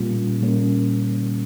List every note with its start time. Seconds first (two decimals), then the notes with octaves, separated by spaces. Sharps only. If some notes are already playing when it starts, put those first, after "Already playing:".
Already playing: A#2 G3 A#3 C#4 F4
0.41 A#2 G3 A#3 C#4